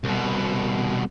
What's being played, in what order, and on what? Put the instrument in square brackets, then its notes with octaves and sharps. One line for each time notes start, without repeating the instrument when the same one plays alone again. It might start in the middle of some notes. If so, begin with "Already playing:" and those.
[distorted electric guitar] C2 B2